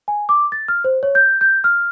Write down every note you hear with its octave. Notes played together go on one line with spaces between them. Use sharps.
G#5
D6
A6
F6
C5
C#5
G6
G6
F6